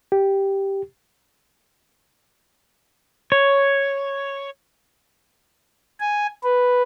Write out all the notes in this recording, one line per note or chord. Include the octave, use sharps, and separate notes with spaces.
G4
C#5
G#5
B4